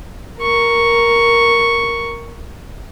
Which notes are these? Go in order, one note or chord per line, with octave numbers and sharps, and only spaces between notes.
A#4 C#6